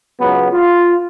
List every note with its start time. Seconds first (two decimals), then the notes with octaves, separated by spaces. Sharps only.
0.21 C#2 F#3 B3
0.52 F4